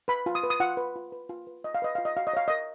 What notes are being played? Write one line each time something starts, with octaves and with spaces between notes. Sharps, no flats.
B4 B5
F4
D#6
B4
D#6
F4 F#5
B4
F4
B4
F4
B4
F4 D#5
F5
B4 D#5
F4 F5
D#5
F#4 F5
D#5
C#5 F5
A#4 D#5